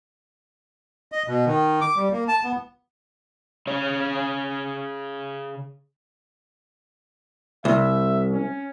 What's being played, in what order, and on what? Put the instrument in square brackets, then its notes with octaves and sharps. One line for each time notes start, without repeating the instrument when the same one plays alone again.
[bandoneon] D#5
B2
D#3
D6
G3
A#3
A5
B3
[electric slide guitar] C#3 C#5 F5
[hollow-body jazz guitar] C2 [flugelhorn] E5
[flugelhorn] C#4